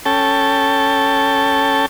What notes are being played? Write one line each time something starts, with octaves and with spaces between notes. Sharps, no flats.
C#4 A4 G5 A5